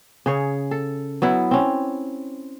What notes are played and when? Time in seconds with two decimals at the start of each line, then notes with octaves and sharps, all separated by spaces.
0.26 C#3 G#4 C#5
0.71 A4
1.22 F#3 B3 E4
1.51 C4 C#4